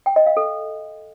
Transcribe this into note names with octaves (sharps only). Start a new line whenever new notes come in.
G5
D#5
F5
A4